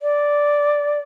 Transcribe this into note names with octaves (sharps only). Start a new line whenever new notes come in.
D5